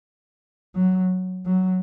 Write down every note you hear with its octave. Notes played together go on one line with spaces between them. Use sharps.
F#3
F#3